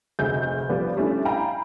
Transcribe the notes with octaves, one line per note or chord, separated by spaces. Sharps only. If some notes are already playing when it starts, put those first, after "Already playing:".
F1 D2 G#3 E5 G6
F3 G3 B3 B4 D5
G3 A3 C#4 D4 E4
F5 G5 G#5 A#5 B5